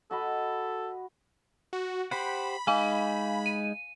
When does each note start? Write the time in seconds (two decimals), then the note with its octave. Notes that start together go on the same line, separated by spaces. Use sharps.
0.11 F#4 A4 D#5 B5
1.73 F#4
2.11 G4 C5 F#5 B5
2.67 G#3 D#4 F5 G#5
3.46 D#7